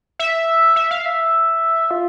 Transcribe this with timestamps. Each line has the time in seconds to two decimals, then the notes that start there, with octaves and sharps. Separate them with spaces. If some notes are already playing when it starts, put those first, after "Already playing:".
0.19 E5
0.76 E5
0.91 F5
1.06 E5
1.91 F4